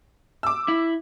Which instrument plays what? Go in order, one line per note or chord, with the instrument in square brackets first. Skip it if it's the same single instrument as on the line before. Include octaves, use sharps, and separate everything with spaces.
[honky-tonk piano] D6 E6
[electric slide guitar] E4